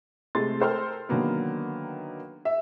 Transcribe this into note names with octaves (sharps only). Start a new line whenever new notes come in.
C3 G#3 A3 C6 A6
A4 A#4 C5 G5 C6 F6
D3 D#3 F#3 A#3 B3
E5